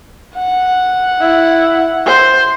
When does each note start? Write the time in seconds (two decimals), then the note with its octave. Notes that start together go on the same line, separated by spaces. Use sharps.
0.38 F#5
1.20 E4
2.06 C5